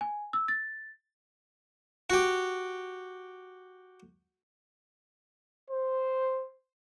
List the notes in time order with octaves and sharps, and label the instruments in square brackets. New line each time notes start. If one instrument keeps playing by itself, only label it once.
[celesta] G#5
E6
A6
[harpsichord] F#4 G4
[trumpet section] C5